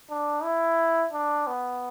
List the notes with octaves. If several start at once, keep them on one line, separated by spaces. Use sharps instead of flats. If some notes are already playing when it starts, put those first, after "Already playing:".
D4
E4
D4
B3